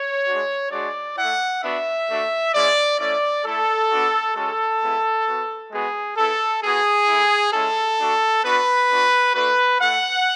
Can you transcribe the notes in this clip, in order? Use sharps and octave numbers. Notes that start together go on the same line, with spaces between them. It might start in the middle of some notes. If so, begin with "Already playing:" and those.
Already playing: C#5
G#3 D4 F#4
G#3 D4 F#4 D5
A3 E4 F#5
B3 D4 F#4 E5
A3 D4 F#4
G#3 C#4 E4 D5
A3 C#4 E4 D5
A3 E4 A4
B3 D4 F#4
G#3 C#4 F#4 A4
G#3 B3 E4
B3 F#4
G#3 B3 F#4 G#4
B3 E4 A4
B3 F#4 G#4
A3 E4
G#3 C#4 E4 A4
A3 D4 F#4
B3 D4 F#4 B4
B3 D4 F#4
A3 D4 F#4 B4
A3 E4 F#5